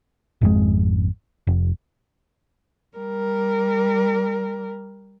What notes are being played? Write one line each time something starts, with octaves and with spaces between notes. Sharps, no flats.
G#1 F2 D#3 G#3
F1
G3 A#4